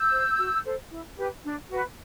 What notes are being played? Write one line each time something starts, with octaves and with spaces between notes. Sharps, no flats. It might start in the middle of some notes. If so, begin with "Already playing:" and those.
Already playing: E6 G6
C5
F#4
A4 C5
E4
G4 B4
D4
F#4 B4